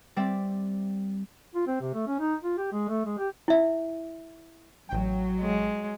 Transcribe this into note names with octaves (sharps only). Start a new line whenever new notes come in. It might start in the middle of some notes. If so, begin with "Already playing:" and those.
G3 C4 D5 E5
F4
C4
C3
A3
C#4
D#4
F4
G4
G#3
A3
G#3
G4
E4 E5
A1 F#3 G5
G#3